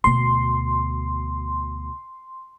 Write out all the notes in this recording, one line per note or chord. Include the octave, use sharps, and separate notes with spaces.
D2 B2 C6